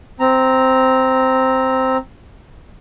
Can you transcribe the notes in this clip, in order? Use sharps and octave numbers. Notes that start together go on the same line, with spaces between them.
C4 A#5